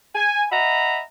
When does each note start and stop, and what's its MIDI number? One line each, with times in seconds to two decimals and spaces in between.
0.15 0.45 80
0.52 1.01 75
0.52 1.01 76
0.52 1.01 78
0.52 1.01 82
0.52 1.01 83